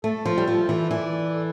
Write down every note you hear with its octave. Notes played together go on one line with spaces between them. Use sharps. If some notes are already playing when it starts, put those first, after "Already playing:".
A3 A4
F3
G3
F3 A4
E3
E3 D5
A4